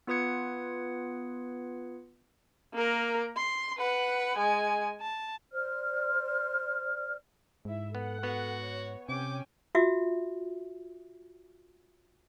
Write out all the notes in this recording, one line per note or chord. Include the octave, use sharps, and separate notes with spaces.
B3 F4 B4 D#6 G#6 C#7
A#3 A#4
C6
B4 F#5
G#3 G#5
A5
C5 D5 F6
G#2 E4 E5
B3 A4 F#5
B3 F#4
C#5
C3 C#4 G5 G#5 D6
F4 F#4 E5